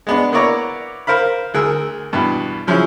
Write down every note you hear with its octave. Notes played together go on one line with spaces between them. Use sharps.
G#3 B3 D4
A#3 B3 E4 C#5 D5 A#5
A#4 C5 F5 B5
D2 G#4 A#4 E6
E2 G2 B2
C#3 F3 F#3 E4 G#4